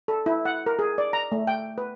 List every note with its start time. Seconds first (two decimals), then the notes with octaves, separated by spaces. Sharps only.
0.08 A4
0.26 E4
0.45 F#5
0.66 A#4
0.79 G#4
0.98 D5
1.13 A#5
1.32 A3
1.47 G5
1.78 B4